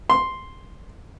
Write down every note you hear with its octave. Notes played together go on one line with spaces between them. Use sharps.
C6